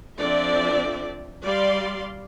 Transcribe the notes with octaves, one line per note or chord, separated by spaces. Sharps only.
F3 C4 D4 A4 D5 E5
G3 D5 F5 C6